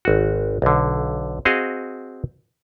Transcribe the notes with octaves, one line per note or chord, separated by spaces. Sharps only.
G#1 F#4
B1 D3
C4 F#4 G#4 D#5 F5